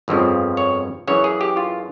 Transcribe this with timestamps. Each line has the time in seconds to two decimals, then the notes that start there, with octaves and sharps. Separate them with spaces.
0.08 G1 F2 C#3 F3
0.57 C#5
1.07 F#2 C#3 E3 C#5
1.24 G#4
1.41 G4
1.57 F4